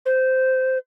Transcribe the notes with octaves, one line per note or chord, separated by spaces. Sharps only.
C5